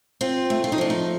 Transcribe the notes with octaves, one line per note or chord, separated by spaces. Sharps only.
C4 F4
A3
F4
D#4
F3 D4
D#4